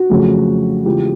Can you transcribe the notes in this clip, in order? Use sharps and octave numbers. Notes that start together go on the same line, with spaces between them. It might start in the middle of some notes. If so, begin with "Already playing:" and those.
Already playing: F#4
F2 C#3 F#3 A3
E2 C#3 F3 G#3 G4